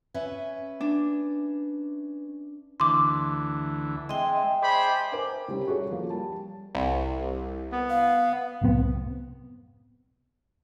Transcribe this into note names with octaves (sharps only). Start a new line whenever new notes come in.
C#4 B4 E5
D4
D2 E3 C6 D6
G#3 C4 D#5 E5 G5
G#4 C5 D5 B5
A#4 C5 G5 G#5 D6
C3 G3 C4 C#4
F#4 G#4 A4 C#5
F3 A#3
G3 A5
C2
B3
F5
C2 F#2 A2 C3 B3 C4